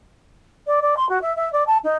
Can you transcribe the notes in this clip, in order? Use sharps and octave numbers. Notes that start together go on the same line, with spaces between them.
D5
D5
C6
F#4
E5
E5
D5
A5
D#4